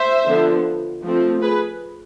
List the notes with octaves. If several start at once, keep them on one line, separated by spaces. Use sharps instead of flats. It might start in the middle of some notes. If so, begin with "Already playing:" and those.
Already playing: C5 E5
D3 F3 B3 D4
F3 A3 C4
G#4 B4